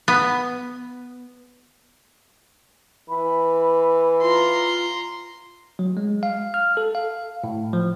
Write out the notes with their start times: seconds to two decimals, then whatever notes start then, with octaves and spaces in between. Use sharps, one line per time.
0.08 B3
3.09 E3 B5
4.22 F4 A#5 C6
5.79 F#3
5.97 G#3
6.23 F5
6.54 F6
6.77 A4
6.95 F5
7.44 A2
7.73 F3